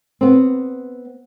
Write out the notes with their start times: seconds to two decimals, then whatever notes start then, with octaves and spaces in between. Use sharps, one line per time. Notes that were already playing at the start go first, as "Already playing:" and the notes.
0.21 B3 C4